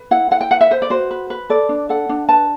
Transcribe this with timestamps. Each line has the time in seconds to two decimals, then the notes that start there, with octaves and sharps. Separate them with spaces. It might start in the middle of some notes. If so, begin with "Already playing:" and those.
Already playing: B4
0.11 E4 F#5
0.31 E4 F#5
0.41 G5
0.51 B4 F#5
0.61 E5
0.71 B4 C5
0.82 D5
0.90 F#4 C5
1.11 B4
1.30 B4
1.50 A4 D5
1.69 D4
1.89 A4 F#5
2.09 D4
2.28 B4 A5